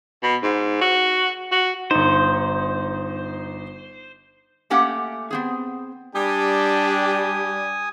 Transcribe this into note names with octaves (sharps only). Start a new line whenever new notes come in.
B2
G#2
F#4
F#4
G1 D#4 C5
A3 A#3 C#4 G4 F#5 G5
B3 C4 G#4
G3 D4 G4 G#5 D#6